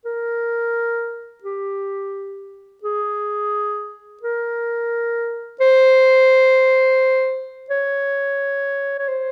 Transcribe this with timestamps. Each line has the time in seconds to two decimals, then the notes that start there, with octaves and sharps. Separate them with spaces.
0.05 A#4
1.43 G4
2.83 G#4
4.22 A#4
5.60 C5
7.70 C#5
8.98 C#5
9.08 C5